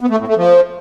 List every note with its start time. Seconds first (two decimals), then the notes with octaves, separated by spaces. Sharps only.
0.01 B3
0.10 A3
0.19 A2
0.28 A3
0.37 F3